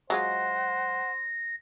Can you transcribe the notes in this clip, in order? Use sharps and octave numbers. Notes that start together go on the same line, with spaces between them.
F#3 G#3 F4 C5 F#5 A#6